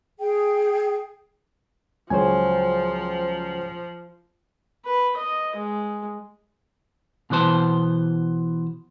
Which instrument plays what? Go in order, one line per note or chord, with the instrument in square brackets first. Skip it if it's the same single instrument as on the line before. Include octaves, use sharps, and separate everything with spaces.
[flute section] G#4 G5
[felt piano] C#2 F#3 [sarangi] F3 [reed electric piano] C5 C#5 G#5
[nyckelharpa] B4
D#5
G#3
[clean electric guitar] B2 E3 B3 C5 A5